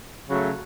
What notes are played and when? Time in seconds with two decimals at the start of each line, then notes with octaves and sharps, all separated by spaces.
0.28 C#3 F#3 A3